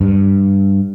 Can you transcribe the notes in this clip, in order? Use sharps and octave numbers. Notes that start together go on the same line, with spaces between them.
G2